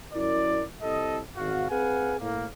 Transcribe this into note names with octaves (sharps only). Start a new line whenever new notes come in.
F#2 E4 A#4 D5
C2 A4 D#5
G#1 F#4 F5
C4 G#4 B4 F5 F#5 G#5
A2 A#3